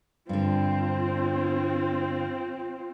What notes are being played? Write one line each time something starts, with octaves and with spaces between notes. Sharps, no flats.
G2 D3 C4 F4